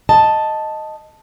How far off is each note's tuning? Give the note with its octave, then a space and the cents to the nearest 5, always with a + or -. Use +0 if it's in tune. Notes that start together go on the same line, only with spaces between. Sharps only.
D#5 +0 A5 +0